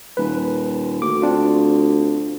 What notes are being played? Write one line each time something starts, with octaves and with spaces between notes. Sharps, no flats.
D#1 B4
D2 D6
C4 D4 F4